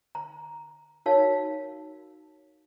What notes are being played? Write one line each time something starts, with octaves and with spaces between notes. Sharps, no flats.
A#5
D#4 F#4 A#4 C#5 F5 A5